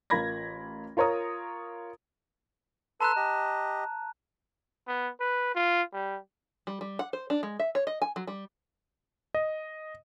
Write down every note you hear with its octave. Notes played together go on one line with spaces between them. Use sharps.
A1 F4 A#4 B5 G#6 A#6
F4 A#4 C#5 A#5 D#6
A4 B4 A5 A#5 C6 F#6
G4 D#5
B3
B4
F4
G3
G3
G3
F#5
C5
D4
G#3
E5
C#5
D#5
G#5
F#3
G3
D#5